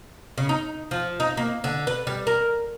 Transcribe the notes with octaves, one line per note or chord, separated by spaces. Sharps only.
C#3
D#4
F3
D#4
A#3
D3
B4
G3
A#4